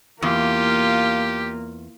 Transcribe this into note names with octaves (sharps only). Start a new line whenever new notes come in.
E2 A#3 F4 G4